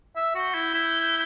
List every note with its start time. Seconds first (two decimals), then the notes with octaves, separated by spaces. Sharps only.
0.16 E5
0.35 F#4
0.44 G6
0.54 E4
0.74 E4